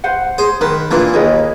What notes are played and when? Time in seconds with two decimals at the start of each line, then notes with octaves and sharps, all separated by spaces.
0.04 B4 C5 F#5
0.38 G#4 C5
0.61 D#3 B4
0.91 A#2 E3 D4
1.14 D#2 G#4 B4 D#5